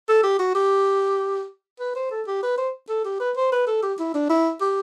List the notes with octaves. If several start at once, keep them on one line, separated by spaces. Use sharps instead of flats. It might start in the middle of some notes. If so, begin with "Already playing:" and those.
A4
G4
F#4
G4
B4
C5
A4
G4
B4
C5
A4
G4
B4
C5
B4
A4
G4
E4
D4
E4
G4